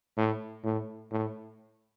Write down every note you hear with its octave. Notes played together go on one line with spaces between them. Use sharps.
A2
A2
A2